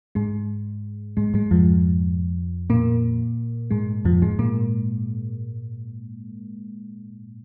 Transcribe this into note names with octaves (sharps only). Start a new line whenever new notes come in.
G#2 G#3
G#2 G#3
G#2 G#3
F2 F3
A#2 A#3
G#2 G#3
F2 F3
G#2 G#3
A#2 A#3